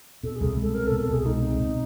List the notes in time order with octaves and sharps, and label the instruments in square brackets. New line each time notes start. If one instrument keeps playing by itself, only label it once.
[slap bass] B2 [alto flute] A4
[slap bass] C2 [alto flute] G#4
[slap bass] G#3 [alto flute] A4
[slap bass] C4 [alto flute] A#4
[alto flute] A4
[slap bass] B2
[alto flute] A4
[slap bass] C2 [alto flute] G#4
[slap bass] G#3 [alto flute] D#4
[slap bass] C4
B2